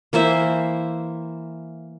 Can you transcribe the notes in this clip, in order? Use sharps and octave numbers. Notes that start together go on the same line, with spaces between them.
E3 A#3 C5 E5